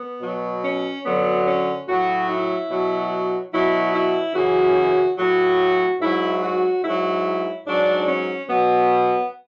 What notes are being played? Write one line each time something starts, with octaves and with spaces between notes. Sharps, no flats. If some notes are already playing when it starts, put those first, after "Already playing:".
Already playing: B3
B2 F#3
C#4
F#2 D3 F#3 B3
C#4
A2 F#3 F#4
E4
B2 F#3
B2 F#3 E4
E4
F#2 C#3 E3 F#4
A2 F#3 F#4
G#2 F#3 E4
F#4
G#2 F#3 E4
G#2 F#3 D4
C#4
B2 F#3 B3